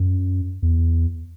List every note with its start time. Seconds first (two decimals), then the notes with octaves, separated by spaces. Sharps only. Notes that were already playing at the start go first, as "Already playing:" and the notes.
Already playing: F#2
0.63 E2